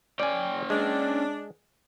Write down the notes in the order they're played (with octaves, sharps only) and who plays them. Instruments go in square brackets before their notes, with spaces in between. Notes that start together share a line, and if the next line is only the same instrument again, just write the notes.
[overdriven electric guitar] C#4 G5 [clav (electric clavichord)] D5 G#5
[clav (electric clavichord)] G#3 [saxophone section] D4